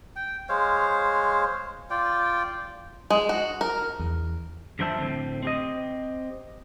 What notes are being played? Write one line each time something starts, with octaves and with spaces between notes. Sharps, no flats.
G5
G#3 C5 C#5 F5
F4 D5 G5
G#3
F#4
A#4
E2
G2 F3 D4 C5 E5 A5
A2 D3 C4
C4 G4 D#5